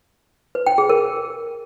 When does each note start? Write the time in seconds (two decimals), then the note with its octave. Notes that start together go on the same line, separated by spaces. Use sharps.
0.55 B4
0.67 G5
0.78 G#4
0.89 A#4